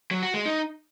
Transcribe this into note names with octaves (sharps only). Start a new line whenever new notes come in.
F#3
F#4
G#3
D#4